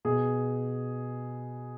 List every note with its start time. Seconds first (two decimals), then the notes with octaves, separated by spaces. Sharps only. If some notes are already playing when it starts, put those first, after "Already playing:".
0.05 B2 G#4